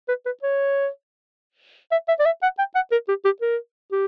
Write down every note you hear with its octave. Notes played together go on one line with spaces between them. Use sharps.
B4
B4
C#5
E5
E5
D5
E5
F#5
G5
F#5
A#4
G4
G4
A#4
G4